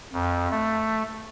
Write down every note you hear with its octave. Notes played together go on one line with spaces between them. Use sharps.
F2
A3